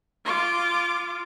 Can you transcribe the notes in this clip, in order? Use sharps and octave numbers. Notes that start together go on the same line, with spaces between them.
F4 D6